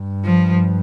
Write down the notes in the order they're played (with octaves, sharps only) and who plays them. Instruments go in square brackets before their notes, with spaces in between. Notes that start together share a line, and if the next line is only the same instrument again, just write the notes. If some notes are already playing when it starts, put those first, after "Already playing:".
Already playing: [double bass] G2
[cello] F3